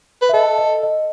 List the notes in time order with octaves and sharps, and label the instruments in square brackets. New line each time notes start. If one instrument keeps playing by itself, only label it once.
[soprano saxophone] B4
[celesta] E5
[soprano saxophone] A4 [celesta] D#5
[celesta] D#5
D#5